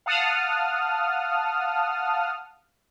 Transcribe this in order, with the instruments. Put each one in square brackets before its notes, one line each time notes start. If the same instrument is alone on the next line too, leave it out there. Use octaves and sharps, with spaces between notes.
[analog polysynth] F5 F#5 A5 D#6 F6